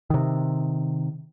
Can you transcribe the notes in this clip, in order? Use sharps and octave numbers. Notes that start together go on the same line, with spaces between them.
C3 D#3